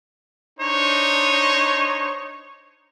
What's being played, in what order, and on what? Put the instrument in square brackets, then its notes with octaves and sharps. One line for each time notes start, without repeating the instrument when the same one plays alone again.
[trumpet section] D4 D#4 C5 C#5